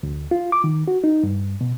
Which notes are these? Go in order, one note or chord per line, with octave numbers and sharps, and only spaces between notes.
D2
F4
D6
D#3
F#4
D#4
G2
B2